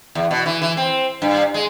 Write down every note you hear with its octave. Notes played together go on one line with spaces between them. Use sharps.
E2
B2
E3
E3
C4
G2
G#3